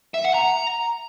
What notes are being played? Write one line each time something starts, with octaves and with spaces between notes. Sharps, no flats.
E5
F#5
A#5